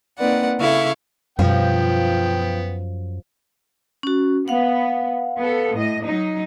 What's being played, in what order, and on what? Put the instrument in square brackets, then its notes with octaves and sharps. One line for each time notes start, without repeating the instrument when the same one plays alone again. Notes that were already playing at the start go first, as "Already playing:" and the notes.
[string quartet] A#3 C4 D#4 B4 D5 F#5
C#3 E4 A4 F5 C#6
[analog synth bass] F#2 [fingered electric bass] B2 G3 [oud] F3 [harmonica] B3 G5
[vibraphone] C#4 F#4
[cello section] B3 [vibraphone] F5 F#5
[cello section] B3 A4
A2 D#5
F#3 D#4